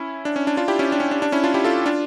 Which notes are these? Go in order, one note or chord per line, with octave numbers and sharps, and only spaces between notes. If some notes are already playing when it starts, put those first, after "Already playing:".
Already playing: C#4 E4
D4
C#4
D4
D4 F4
E4 G4
C#4 E4
D4
C#4
D4
D4
C#4 E4
D4 F4
E4 G4
F4 A4
D4 F4